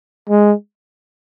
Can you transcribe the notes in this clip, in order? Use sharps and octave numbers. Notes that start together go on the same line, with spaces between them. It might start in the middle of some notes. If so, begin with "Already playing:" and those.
G#3